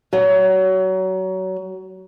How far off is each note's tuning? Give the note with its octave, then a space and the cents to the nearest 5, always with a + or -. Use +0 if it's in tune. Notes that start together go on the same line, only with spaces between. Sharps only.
F#3 +25